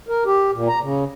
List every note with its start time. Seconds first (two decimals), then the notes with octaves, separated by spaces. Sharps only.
0.09 A#4
0.26 G4
0.53 A#2
0.68 A#5
0.82 C#3